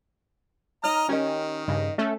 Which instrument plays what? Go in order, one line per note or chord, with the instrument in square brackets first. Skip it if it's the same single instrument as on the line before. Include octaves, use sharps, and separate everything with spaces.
[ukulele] D#4 C#5 [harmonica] D#5 A#5 [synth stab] F6
[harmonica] D#3 [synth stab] C#4 [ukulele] G4 A#4 D#5
[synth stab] G2 C#3 [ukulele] D#5
[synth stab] A3 C#4 A4 [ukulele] E5